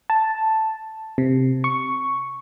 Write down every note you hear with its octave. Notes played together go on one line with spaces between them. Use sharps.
A5
C3
C#6